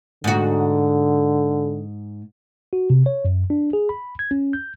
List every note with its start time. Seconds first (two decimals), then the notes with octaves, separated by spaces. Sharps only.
0.24 G#2 D3 F#4
2.73 F#4
2.90 C3
3.06 C#5
3.25 F#2
3.50 D4
3.73 G#4
3.89 B5
4.19 G#6
4.31 C#4
4.53 G6